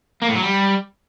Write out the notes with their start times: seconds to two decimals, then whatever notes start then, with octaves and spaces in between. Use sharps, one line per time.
0.22 A#3
0.29 A2
0.35 F#3
0.42 G3